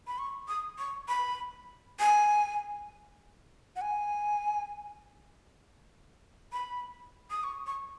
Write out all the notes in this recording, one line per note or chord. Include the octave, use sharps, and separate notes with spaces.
B5
C#6
D#6
C#6
B5
G#5
F#5
G#5
B5
D#6
C#6
C#6